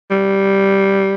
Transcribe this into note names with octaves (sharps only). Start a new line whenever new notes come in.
G3